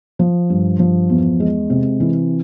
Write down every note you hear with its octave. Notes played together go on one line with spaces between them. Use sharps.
F3
G2
F3
E2
G#3
C3
E3